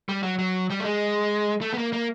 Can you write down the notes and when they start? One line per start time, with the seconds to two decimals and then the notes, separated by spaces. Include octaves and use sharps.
0.09 G3
0.23 F#3
0.39 F#3
0.70 G3
0.79 A3
0.84 G#3
1.61 A3
1.74 B3
1.78 A#3
1.93 A#3